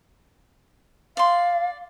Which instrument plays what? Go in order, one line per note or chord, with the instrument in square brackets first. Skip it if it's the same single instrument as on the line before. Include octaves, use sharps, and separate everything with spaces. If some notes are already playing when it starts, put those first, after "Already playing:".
[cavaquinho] D5 C6 [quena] F5